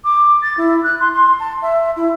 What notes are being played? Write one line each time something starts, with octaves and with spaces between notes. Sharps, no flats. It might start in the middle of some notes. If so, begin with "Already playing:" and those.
D6
A6
E4
F#6
C6
C6
A5
E5
E4